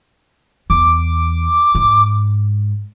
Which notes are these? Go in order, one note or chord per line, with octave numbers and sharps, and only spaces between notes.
E2 D6
G#2